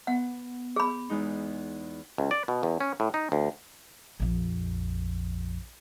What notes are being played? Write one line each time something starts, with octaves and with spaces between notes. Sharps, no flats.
B3 F#5
G#4 B5
E2 G#3 D#4
C#2
D5
B2
E2
C#4
A2
D#4
D2
A#1 F2